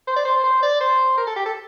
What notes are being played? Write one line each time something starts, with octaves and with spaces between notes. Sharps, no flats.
C5
D5
C5
C5
D5
C5
A#4
A4
G4
A4